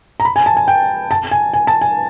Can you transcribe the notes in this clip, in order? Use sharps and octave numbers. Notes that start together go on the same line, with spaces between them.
A#5
B5
G#5
A5
G#5
G5
A5
G#5
G#5
A5
G#5